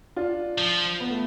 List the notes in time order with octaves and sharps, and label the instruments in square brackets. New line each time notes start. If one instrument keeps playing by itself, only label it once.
[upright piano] D4 F4
[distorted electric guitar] F3
[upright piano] B3
A3